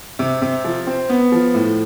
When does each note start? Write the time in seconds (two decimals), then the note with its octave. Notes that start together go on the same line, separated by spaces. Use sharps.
0.19 C3
0.42 C3
0.64 F3
0.87 C4
1.09 B3
1.32 F3
1.54 A2